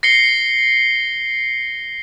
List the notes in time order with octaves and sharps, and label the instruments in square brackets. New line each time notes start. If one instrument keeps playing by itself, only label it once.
[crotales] A#6 C7 C#7 G7